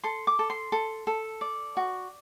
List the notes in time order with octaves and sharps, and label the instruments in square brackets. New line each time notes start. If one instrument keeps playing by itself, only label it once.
[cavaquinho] A4 C6
D6
A4
C6
A4
A4
D5
F#4